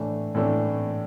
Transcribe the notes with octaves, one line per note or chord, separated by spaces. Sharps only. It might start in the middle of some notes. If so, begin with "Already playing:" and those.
Already playing: A2 E3 A3 D4
A2 E3 A3 D4